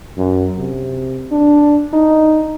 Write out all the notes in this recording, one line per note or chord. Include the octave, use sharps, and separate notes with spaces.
F#2
C3
D4
D#4